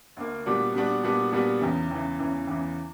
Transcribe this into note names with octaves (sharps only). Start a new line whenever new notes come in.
D2 D3 A#3
A#2 G3 B3 D4 F#4
A#2 G3 B3 D4 F#4
A#2 G3 B3 D4 F#4
A#2 G3 B3 D4 F#4
E2 C#3 E3
E2 C#3 E3
E2 C#3 E3
E2 C#3 E3